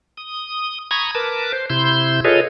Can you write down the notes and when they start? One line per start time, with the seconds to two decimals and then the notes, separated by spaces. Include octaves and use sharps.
0.17 D#6
0.91 A#5 B5 C#6 D#6 G#6
1.15 A#4 B4 A5 D6
1.53 C5
1.70 C3 E4 C6 G6
2.25 F4 G#4 A4 B4 C#5 D#5